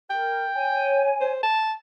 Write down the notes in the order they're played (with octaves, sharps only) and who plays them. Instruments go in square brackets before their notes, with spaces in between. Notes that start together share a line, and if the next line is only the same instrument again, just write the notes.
[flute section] A#4 [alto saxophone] G5
[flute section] C#5 G#5
[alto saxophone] C5
A5